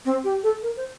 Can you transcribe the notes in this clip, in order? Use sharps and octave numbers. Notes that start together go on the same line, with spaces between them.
C4
G4
A4
A#4
C5